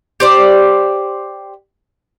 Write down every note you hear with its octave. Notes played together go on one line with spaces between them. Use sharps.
G4 C5 D5